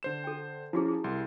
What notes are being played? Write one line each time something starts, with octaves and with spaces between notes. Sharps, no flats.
D3 C5 E7
A4 G5
F3 C#4 E4 F#4 G#4
E4 G#4
C2 C6